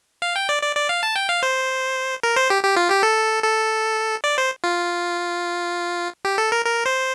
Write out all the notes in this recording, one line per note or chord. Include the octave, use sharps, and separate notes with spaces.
F5
G5
D5
D5
D5
F5
A5
G5
F5
C5
A#4
C5
G4
G4
F4
G4
A4
A4
D5
C5
F4
G4
A4
A#4
A#4
C5